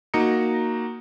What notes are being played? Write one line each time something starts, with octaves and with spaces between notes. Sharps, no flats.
A#3 D#4 F#4 A#5 D#6 C#7